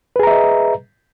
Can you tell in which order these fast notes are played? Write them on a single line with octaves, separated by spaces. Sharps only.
B4 G#4 A#5 E5 D#5